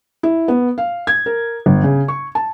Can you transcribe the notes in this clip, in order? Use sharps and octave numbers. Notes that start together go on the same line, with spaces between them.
E4
B3
F5
G#6
A#4
G1
C#3
C#6
A5